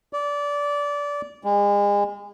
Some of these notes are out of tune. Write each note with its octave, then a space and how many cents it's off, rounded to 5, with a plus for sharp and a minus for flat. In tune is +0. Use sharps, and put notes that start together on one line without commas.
D5 -20
G#3 -35